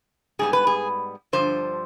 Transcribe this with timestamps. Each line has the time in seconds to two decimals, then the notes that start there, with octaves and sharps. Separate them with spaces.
0.39 G#2 G3 B3 G#4
0.53 B4
0.67 G#4
1.33 G2 D3 F3 C5